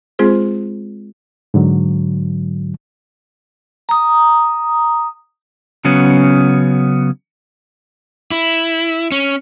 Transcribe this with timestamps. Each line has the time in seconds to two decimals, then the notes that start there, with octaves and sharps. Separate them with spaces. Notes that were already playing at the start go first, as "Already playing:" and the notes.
0.19 G#3 C4 F4 G#4 C5
1.54 G#2 D3 F#3
3.89 A#5 D#6
5.85 C#3 F#3 B3 C#4
8.31 E4
9.12 C#4